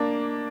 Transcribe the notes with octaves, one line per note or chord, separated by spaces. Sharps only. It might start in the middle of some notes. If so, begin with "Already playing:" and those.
Already playing: A#3 D4